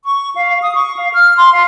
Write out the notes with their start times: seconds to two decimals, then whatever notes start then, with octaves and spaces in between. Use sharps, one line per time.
0.04 C#6
0.36 F5
0.62 D#6
0.75 C#6
0.96 F5
1.14 F6
1.37 C6
1.52 F5